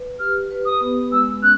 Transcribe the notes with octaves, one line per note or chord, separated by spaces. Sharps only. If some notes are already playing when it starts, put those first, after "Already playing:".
Already playing: B4
G4 F6
B4
D#6
B3
G#3 E6
C#4 F#6